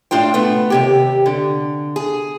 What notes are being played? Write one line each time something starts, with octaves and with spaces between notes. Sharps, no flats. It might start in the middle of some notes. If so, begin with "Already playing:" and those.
A2 D4 F4 G5
A3 B3
D#2 C3 G4
D3
G#4